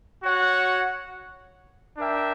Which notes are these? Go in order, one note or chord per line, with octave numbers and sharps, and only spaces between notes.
F#4 C#5 F#5
D4 A#4 E5 G5